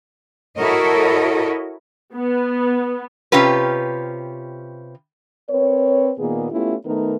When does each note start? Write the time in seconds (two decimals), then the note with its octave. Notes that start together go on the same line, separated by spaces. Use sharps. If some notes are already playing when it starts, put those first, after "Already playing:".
0.57 E4 F#4 A4 A#4 C#5 D#5
2.14 B3
3.32 C3 C#4 F4 G4 B4
5.50 C4 A#4 B4 C#5
6.19 A#2 D#3 A#3 B3 G#4
6.52 A3 B3 C#4 E4 F4 G4
6.86 D#3 A3 B3 D#4 A#4